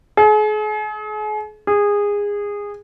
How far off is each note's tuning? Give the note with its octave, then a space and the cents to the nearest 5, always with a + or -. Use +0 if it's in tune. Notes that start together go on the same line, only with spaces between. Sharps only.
G#4 +40
G#4 -20